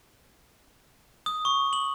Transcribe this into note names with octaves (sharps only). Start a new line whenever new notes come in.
D#6
C#6
F#7